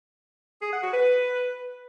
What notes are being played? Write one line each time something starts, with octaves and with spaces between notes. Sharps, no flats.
G#4
F#5
F#4
B4